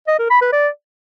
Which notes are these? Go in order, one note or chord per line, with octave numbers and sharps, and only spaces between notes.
D#5
A#4
B5
B4
D5